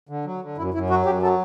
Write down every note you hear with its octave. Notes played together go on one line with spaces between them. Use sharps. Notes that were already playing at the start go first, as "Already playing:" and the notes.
D3
F#3
D3
F#2 E4
F#2 E4
F#3 F#4
F#2 G4
F#3 A4